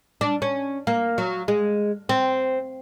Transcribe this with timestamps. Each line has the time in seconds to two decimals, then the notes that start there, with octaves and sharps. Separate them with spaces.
0.21 D4
0.42 C#4
0.87 A#3
1.18 F#3
1.48 G#3
2.09 C4